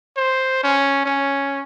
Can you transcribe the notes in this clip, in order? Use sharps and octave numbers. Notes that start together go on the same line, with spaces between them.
C5
C#4
C#4